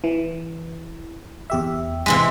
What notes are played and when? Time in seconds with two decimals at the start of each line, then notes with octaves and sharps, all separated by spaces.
0.04 E3
1.50 E2 G4 E5
2.06 C3 E3 G#3 B6